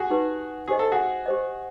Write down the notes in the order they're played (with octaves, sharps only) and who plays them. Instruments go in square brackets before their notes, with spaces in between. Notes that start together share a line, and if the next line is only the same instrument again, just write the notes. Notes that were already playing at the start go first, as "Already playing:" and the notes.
Already playing: [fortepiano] F#4 G#4
[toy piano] D#4 G4 B4
[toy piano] G4 C5 D#5 [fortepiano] G#4
[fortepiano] A4
F#4 G#4
[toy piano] G4 C5 D#5